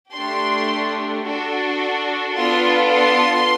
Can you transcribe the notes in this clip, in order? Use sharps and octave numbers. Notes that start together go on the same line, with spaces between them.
A3 D4 G4 C6
D4 F#4 A4
B3 D4 F4 A4 C6
C6